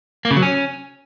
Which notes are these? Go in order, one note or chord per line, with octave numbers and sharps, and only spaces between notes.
A#3
C#3
F#3
C#4